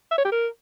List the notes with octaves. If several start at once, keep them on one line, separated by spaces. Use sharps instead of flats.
E5
C#5
G4
A#4